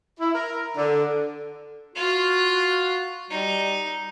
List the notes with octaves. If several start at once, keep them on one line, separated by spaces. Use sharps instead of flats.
E4
A#4
D3
F4 F#4 F5
G3 D#4